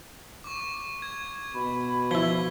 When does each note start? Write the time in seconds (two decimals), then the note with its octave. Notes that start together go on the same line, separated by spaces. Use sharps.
0.44 C#6 D6
1.02 G#6
1.54 B2 B5
2.11 F3 E4 G#6 B6 G7